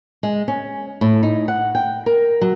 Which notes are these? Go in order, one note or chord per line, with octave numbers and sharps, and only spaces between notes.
G#3
C#4
A2
D#4
F#5
G5
A#4
F#3